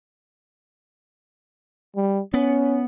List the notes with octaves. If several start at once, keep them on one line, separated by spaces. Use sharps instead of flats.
G3
B3 C#4